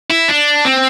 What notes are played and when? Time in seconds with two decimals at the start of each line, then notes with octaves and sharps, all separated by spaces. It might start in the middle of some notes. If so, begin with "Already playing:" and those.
0.10 E4
0.28 D4
0.65 C4